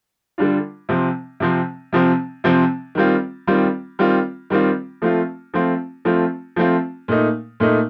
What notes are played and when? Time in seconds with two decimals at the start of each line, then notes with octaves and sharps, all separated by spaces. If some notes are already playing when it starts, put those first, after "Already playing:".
0.38 D3 G3 D4 F4
0.89 C3 F3 C4
1.40 C3 F3 C4
1.93 C3 F3 C4
2.44 C3 F3 C4
2.95 D#3 G3 C4 F4
3.47 D#3 G3 C4 F4
3.99 D#3 G3 C4 F4
4.50 D#3 G3 C4 F4
5.02 F3 A3 C4 F4
5.54 F3 A3 C4 F4
6.05 F3 A3 C4 F4
6.56 F3 A3 C4 F4
7.08 A#2 A3 D#4
7.60 A#2 A3 D#4